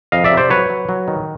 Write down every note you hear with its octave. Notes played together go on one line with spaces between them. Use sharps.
F2 D#5 F5
D5 E5
C3
C5 D5
F#3 B4 C#5
F#3
F#3
D#3